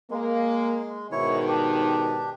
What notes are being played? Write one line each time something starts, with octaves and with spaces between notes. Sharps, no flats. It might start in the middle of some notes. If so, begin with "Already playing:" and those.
G#3 A#3
G#2 B2 D#3 E4 C#5
D4 G4